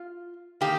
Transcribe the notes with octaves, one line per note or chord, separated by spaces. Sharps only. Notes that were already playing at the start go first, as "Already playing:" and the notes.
Already playing: F4
D#3 A#3 D#4 G4